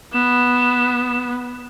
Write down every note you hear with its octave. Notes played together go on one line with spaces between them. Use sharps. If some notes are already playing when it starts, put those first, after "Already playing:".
B3 E7